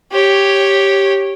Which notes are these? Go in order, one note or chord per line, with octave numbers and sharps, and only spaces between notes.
G4 C#5